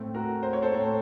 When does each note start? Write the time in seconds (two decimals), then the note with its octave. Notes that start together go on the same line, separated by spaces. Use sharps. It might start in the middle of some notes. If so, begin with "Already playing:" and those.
Already playing: A2 A3 C4
0.14 F#4 A#4
0.43 C5
0.53 C#5
0.62 A4 C5
0.72 A2 A3 C4